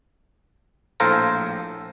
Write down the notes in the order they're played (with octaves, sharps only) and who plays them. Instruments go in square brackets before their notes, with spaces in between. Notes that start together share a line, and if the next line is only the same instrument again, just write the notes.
[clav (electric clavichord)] A#1 A2 A4 C5 F5 A#5